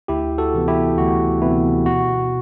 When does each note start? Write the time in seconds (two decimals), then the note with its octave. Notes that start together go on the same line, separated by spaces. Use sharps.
0.08 D2 E4 G4
0.38 F#4 A4
0.54 C3 E3 B3
0.68 E4 G4
0.97 D2 F#4
1.42 C3 E3 B3 E4
1.86 B2 F#4